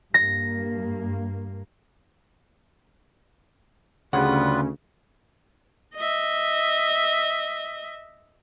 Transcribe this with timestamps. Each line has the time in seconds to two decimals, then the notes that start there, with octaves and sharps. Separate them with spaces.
0.14 G2 A#3 A#6
4.13 D2 C#3 G3 F4 B4 F#5
5.95 D#5 E5